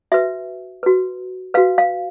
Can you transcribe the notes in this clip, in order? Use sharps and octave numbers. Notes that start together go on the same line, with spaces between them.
F#4 B4 E5
F#4 B4
F#4 B4 F5
F5